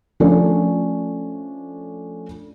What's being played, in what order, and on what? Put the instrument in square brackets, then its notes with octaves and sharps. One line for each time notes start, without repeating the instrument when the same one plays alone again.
[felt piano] F3 A3 C#4 D4